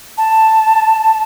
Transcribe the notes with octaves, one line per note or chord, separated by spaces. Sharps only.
A5